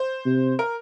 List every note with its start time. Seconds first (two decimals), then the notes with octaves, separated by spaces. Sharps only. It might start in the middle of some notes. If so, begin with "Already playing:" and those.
Already playing: C5
0.26 C3
0.59 A#4